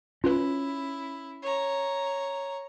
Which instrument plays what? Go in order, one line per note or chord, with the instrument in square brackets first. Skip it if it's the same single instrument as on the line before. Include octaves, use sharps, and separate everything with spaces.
[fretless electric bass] C#4 [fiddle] E4 [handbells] F4 B4
[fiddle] C#5 A#5